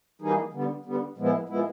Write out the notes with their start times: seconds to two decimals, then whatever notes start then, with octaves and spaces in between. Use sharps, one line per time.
0.22 E3 G3 A#3 D#4 G#4
0.53 D3 G3 B3
0.85 D3 G3 B3
1.17 A#2 F3 G#3 B3 E4
1.49 A#2 F3 G#3 B3 E4